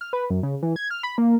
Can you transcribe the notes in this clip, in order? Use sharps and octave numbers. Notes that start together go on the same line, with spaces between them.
F6
B4
F#2
C#3
E3
G#6
F6
B5
A#3